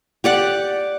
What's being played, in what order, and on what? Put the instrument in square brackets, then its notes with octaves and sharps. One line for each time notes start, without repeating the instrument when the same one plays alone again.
[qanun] G4 D5 F#5